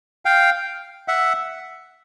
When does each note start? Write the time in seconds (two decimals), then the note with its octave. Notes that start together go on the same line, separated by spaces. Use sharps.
0.25 F5 G5
1.08 E5 F#5